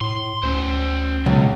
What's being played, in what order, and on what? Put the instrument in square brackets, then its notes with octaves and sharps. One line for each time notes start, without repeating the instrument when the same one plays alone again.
[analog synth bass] A2 [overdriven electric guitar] C6
[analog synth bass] D2 [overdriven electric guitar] C#4 C5
[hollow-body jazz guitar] C#2 [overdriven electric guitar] B2 [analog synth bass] F#3